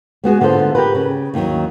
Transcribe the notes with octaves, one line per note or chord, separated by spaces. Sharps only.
G#3 B3 F#4 G#4
D3 B3 F4 A4 C5
G4 A#4 B4
C#3
D#2 D#3 F#3